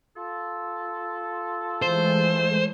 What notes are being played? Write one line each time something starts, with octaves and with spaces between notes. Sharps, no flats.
F4 A4
E3 G#3 A3 C5